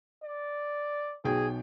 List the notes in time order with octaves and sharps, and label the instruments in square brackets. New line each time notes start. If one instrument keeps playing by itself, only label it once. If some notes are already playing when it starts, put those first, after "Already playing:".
[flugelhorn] D5
[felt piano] B1 B2 G5 [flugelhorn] G#4